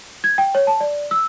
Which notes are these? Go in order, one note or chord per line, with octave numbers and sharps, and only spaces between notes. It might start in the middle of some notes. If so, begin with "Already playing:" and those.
G#6
G5
C#5
A5
D5
E6